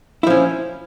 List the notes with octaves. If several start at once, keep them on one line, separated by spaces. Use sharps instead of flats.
F3 C#4 E4